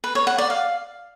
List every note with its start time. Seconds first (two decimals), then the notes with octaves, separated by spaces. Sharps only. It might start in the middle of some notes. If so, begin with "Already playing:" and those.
0.04 B4
0.15 C#5
0.27 F#5
0.38 D5
0.50 F5